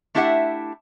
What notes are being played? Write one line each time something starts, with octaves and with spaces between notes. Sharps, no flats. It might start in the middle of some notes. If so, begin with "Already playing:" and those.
A3 D4 E4 G4 E5 F#5